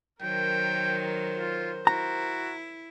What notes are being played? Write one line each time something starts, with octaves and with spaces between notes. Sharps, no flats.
D#3 F#3 A#4 C5 G5
F4
E4 F#4 A#5